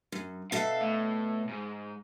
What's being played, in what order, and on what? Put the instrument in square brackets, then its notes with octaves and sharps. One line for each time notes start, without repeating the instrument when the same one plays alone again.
[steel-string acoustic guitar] F#2
[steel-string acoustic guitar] B2 A4 E5 [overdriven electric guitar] F5
[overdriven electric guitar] A2
G#2